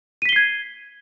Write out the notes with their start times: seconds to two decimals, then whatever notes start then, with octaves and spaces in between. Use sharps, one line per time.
0.22 D#7
0.25 B6
0.29 G7
0.33 C7
0.36 G#6